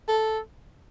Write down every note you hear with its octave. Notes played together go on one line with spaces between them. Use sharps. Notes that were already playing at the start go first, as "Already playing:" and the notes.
A4